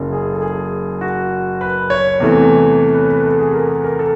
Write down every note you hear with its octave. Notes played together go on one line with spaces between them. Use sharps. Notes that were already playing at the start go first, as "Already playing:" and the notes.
Already playing: F#1 F#2 C#3
G#4
A4
G#4
F#4
B4
C#5
E2 C3 E3 A3
B4
B4
A4
G#4
A#4
B4
A#4
A4